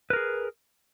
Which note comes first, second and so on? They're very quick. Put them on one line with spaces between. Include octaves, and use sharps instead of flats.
B4 A#4 G#4